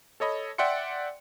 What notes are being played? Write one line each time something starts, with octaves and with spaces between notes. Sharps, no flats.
A4 C#5 D#5 B5
D5 E5 F#5 G5 C6 C#7